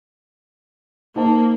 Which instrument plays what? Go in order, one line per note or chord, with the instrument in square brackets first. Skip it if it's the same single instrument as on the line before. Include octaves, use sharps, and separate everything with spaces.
[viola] A#3 [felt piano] D#4 C5 A5